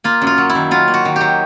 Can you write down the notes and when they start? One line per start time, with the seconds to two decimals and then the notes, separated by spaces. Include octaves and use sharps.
0.04 A#3 F4
0.22 F#2
0.27 F4
0.38 F#3
0.50 E4
0.55 D#3
0.71 F#3 F4
0.88 A#3
0.94 F#4
1.05 D#3
1.16 F#3 G4